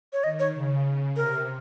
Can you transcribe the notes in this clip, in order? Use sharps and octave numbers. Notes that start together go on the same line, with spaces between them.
C#5
D#3 D#5
C#5
C#3
C3 A#4